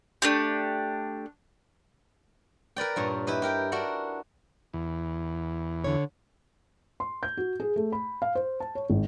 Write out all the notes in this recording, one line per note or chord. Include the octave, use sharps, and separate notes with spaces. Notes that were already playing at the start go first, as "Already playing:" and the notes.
A3 D4 G4
A#4 B4 D5 G5
G2 A#2 C#5
E4 G4 B4 D#5
G4 A#4 G5
D4 F#4 A#4 F#5
E2
D3 C#5
C6
G6
F#4
G#4
A3
B5
F5
C5
A5
C#5
G#1